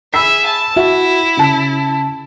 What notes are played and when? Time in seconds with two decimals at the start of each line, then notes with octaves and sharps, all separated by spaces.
0.14 G#4 E5 B5 E6 B6
0.46 A5
0.76 E4 F#4 E5 F#5
1.37 C#3 A5